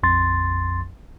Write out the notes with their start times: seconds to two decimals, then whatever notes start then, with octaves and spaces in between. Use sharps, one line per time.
0.03 A#1 F2 C6 A6